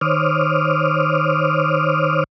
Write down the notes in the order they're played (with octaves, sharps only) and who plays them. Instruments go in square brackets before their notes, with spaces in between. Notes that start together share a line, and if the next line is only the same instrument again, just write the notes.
[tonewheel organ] D#3 C5 C#5 D6 D#6 F6